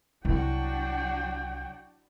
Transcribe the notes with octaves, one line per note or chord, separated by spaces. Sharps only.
C2 F#3 D4 E4 F#4 G5